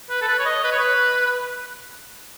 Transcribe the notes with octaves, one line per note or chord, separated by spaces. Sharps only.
B4
A4
B4
C#5
D#5
B4
C#5
B4